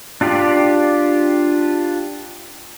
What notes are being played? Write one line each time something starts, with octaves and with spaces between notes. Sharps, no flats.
D4 F4 G4 D5